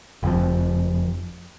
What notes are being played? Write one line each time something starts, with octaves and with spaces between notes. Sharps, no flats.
F#1 F2 F3